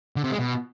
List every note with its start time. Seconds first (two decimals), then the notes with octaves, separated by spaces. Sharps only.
0.16 D3
0.24 C3
0.32 G#3
0.39 B2